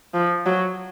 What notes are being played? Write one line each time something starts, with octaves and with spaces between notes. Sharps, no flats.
F3
F#3